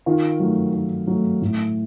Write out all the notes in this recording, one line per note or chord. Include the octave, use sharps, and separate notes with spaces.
D#3 F4
F#3 A3
D#3
F#3 A3
A2